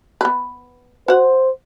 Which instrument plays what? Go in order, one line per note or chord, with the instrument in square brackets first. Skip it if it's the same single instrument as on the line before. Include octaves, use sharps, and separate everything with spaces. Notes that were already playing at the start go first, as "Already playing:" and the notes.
[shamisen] B3 B4
[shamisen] F#4 F#5 [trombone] C5